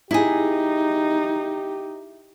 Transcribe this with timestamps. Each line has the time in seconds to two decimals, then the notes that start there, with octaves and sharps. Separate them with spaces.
0.11 D#4 E4 G4 G#4